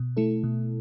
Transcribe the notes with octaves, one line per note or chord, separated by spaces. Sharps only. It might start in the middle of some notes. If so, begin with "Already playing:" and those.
Already playing: B2
A3 E4 A4
B2